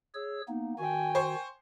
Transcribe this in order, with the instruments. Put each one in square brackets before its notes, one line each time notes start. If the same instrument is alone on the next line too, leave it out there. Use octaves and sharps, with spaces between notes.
[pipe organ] G#4 C#5 E6
A#3 B3 D#4
[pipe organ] D#3 F#4 [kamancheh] G5 G#5
[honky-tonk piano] C5 C#6